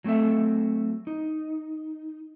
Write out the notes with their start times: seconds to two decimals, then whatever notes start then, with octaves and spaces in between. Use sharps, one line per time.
0.04 F#3 A3 C4 A4 E5
1.07 D#4